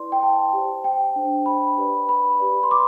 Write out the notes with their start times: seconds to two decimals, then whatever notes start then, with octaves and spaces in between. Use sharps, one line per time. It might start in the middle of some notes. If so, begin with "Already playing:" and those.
Already playing: E4 B4 D5 C6
0.12 G5
0.23 A5
0.53 G4 C5
0.84 G5
1.16 D4 A4 C5
1.46 B5
1.77 G4 B4 D5
2.09 B5
2.39 G4 B4 D5
2.63 C6
2.71 D6